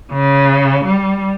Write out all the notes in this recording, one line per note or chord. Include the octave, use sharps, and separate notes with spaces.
C#3
G3